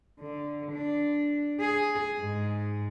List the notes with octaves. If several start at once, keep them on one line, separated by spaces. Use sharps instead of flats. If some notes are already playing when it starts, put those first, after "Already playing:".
D3
D4
G#4
G#2